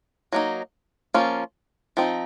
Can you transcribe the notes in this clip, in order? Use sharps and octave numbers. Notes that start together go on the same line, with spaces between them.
F#3 A#3 D#4
F3 A#3 C#4 F4
F3 C4 D#4